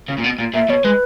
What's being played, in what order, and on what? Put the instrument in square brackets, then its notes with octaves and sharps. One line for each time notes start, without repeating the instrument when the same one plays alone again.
[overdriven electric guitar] C#3
A#2
B2
A#2
[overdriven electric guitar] A#2 [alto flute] E5
[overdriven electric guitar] B2 [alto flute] C#5
[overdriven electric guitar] G#3 [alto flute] B4